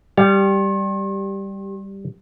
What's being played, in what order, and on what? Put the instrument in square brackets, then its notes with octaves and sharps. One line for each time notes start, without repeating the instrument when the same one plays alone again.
[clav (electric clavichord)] G3 [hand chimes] G4